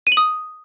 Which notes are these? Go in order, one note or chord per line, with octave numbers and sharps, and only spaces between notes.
D#7
F#7
D#6